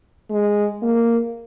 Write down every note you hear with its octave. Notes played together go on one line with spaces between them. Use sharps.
G#3
A#3